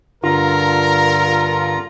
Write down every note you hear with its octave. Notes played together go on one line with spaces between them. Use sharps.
G2 D3 F4 A#4 A#5